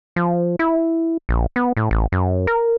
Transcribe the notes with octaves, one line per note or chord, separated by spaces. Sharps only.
F3
E4
A#1
B3
A2
A1
F#2
A#4